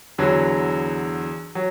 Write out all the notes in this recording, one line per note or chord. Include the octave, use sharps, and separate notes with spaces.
E2 D3 F#3
F#3